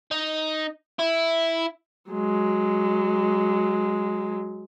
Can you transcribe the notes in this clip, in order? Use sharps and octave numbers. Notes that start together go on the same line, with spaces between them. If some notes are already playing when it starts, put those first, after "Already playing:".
D#4
E4
F#3 G#3